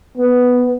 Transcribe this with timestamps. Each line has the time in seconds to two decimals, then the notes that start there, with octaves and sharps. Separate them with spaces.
0.18 B3